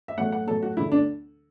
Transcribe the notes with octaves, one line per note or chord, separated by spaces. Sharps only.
E5
A2 F#3 A3 F#5
F#5
A2 F#3 A3 A4
F#4
D2 D3 A3 E4
D4